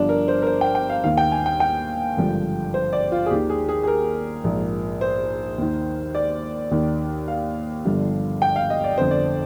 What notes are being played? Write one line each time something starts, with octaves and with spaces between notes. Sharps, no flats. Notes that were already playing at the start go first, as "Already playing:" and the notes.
Already playing: G1 G2 F3 D4
A#4
C5
A#4
C5
G5
G5
F5
D#2 D#3 F5
G5
G#5
G5
G5
G#1 G2 D3 F3
C5
D5
F4
G#4
D#2 D#3 G4
G#4
G#4
G#4
A#4
A#1 G#2 F3
C5
D#2 D#3
D5
D#2 D#3
F5
G1 G2 D3 F3
G5
F5
D#5
D5
G1 F2 D3 C5
D5